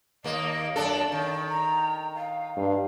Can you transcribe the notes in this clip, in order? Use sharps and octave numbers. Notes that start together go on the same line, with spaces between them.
D#2 A#3 D#5
F#2 D4 A4 A5
D#3
A#5
F5
G2